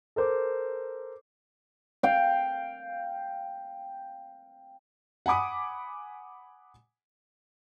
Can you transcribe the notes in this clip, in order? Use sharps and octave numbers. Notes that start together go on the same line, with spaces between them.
A4 A#4 C5 D6
F5 G5
F#5 G#5 B5 D6 D#6